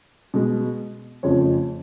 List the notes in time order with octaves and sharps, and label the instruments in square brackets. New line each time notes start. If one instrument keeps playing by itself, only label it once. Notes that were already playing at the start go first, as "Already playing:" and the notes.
[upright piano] B2 G#3
F2 C#3 F3 A3 C#5